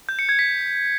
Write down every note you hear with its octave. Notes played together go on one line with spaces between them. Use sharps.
G6
C#7
G#6
B6